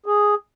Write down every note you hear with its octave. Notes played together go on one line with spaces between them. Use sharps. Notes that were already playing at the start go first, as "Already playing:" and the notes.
G#4